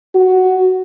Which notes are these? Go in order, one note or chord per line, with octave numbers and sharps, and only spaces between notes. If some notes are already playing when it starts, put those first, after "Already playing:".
F#4